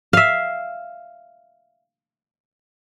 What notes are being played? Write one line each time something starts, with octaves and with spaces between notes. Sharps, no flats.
E5 F5